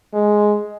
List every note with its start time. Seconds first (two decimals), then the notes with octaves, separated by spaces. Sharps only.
0.13 G#3